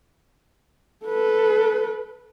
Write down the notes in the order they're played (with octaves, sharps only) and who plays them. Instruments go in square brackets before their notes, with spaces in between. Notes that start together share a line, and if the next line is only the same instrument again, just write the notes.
[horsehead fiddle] A4 B4